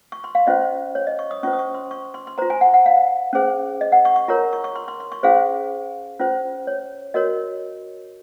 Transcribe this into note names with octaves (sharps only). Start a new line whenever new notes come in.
C#6
C6
F5
C#4 F4 C5 D#5
C#5
D#5
C#6
D#6
C#4 F4 C5 C#6
D#6
C#6
C6
C#6
C6
C6
F4 C5 A#5
G#5
F#5
F#5
F5
C#4 G#4 C5
D#5
F#5
C#6
C#6
F4 A#4 C#5 A#5
C#6
C#6
C6
C6
C6
C#6
C#4 F4 G#4 C5 F5
C#4 F4 C5
C#5
F#4 A#4 C#5 D#5